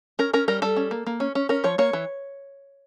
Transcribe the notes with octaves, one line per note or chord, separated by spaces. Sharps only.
C#4 A#4
C#4 A#4
G3 A#4
G3 A4
C#4
A#3
A#3
C#4
C#4
C#4 A#4
F3 C#5
A#3 C#5
E3